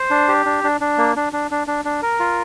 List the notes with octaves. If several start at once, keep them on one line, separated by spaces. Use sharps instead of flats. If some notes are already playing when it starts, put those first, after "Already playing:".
Already playing: C5
D4
G4
D4
D4
D4
A#3
D4
D4
D4
D4
D4
A#4
F4